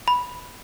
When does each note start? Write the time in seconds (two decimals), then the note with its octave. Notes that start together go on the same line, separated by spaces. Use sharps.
0.08 B5